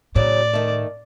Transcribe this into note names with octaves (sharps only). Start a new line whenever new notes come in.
A2 C#3 F#3 D#4 D5
D#3 A3